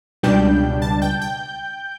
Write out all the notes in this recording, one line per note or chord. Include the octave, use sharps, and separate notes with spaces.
C#2 B2 G3 D4 G5 G6
A5 A6
G5 G6
G5 G6